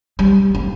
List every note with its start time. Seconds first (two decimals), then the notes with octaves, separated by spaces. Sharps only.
0.19 G3
0.55 A#3